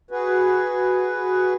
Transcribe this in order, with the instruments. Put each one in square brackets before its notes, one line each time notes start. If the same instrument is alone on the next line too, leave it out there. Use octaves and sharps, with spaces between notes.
[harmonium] F#4 G#4 B4